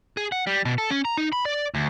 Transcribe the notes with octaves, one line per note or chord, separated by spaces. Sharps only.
G#4
F#5
G3
B2
A4
C#4
A#5
D#4
B5
D5
D2